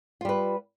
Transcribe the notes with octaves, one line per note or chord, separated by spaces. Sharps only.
G3 F4 B4